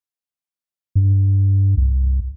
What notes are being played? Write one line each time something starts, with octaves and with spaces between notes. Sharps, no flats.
G2
C2